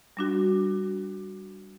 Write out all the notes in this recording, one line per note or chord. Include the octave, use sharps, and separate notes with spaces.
G3 D4 F#4